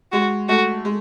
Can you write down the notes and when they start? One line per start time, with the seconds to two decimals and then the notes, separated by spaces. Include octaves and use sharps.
0.12 G#3 F#4
0.49 A3 F#4
0.85 G#3